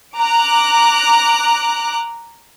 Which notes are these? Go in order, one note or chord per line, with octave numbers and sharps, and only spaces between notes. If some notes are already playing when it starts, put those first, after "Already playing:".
A#5 D6 F#6